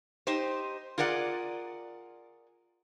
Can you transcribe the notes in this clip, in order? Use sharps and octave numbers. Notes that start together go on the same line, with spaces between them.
D#4 G4 C5
F4 G#4 A#4 D5 F#5